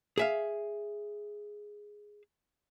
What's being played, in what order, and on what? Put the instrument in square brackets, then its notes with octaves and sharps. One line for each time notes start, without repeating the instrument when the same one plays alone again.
[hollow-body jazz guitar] G#4 E5 F5